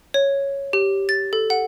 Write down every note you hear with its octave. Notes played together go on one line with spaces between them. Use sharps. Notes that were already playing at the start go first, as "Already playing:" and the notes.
C#5
G4
A6
A4
F#5